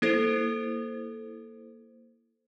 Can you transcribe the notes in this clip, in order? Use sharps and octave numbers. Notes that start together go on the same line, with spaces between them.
A#3 E4 A4 C5